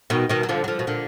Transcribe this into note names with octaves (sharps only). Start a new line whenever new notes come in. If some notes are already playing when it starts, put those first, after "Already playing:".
B2 D#3
B2 D#3
F#3
D3 F3
F#3
D3 F3
B2
A#2 D3